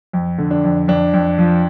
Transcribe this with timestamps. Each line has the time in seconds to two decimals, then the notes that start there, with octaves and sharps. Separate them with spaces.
0.13 F2
0.38 D3
0.51 D4
0.64 F2
0.88 F2 D4
1.13 F2
1.38 F3